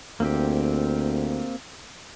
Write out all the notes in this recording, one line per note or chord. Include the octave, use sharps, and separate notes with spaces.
D2 A#3 C4 G4